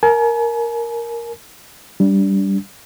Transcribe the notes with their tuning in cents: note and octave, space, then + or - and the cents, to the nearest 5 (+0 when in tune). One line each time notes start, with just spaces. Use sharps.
A#4 +0 G#5 +40
G3 +0 D4 -20